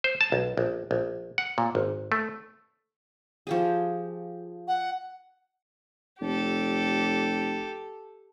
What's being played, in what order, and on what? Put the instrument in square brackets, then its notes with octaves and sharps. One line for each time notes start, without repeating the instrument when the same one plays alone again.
[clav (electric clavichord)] C5
A5
B1
A#1
A#1
F#5
A#2
G#1
A3
[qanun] F3 G4 G#4
[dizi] F#5
[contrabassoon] F1 [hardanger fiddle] G4 A4